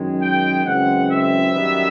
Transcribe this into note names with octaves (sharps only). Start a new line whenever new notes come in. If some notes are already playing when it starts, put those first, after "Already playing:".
Already playing: F#2 D#3 G#3
G5
F#2 C#3 E3 G#3 C4 F#5
E5
F#2 D#3 G3 B3